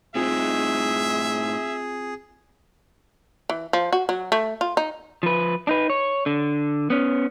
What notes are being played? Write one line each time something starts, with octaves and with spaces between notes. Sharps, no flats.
A2 C4 D#4 F4 G#4 E5
E3
F3
F#4
F#3
A3
F4
D#4
F3 B4
D4 D#4 B4
C#5
D3
B3 C#4